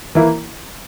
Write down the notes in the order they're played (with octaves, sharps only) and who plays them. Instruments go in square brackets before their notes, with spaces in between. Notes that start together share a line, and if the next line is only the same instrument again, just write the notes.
[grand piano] E3 A#3 E4